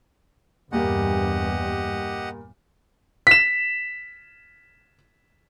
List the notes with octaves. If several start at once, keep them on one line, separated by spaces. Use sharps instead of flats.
E2 G2 A#2 G3 A#3 G4 D#5 F#5
B6 E7